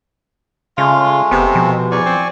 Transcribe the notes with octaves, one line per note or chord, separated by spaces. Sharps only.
C#3 G#3 A3 F4
F1 C3 B3
B2 F3
E2 D5 G#5 C#6
C4